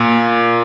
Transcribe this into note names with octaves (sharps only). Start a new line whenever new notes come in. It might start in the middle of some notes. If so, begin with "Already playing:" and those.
Already playing: A#2